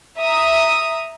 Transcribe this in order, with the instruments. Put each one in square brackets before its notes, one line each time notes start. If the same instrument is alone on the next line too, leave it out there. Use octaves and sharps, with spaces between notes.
[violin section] E5 A#5 D#6